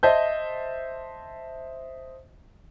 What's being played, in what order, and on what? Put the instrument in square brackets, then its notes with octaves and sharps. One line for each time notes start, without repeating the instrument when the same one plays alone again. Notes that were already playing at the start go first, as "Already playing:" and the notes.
[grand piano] C5 D#5 E5 A5 G6